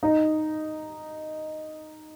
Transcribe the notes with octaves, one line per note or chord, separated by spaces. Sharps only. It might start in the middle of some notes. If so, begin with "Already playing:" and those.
D#4